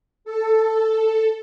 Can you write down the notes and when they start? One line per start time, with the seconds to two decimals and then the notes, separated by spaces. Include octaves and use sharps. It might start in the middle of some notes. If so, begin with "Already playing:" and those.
0.25 A4